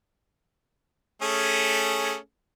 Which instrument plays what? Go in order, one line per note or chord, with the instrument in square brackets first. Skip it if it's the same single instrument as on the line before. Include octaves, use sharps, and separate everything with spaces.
[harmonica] A3 C#4 G#4